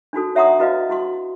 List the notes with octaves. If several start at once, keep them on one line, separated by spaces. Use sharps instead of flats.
D4 D#4 F#4 A4
C#5 E5 F#5 A#5 C6 D#6
E4 F#4 B4 D#5 F5
E4 F#4 C6